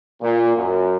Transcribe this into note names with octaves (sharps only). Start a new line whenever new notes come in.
A#2
F#2